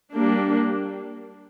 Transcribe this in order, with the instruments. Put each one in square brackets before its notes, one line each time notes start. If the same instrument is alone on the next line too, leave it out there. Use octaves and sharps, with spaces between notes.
[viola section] G3 A#3 D4